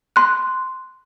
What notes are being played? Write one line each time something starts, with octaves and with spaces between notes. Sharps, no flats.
C6 F#6